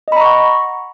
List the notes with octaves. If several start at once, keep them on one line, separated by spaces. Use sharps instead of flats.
D#5 F#5 A#5 B5 C#6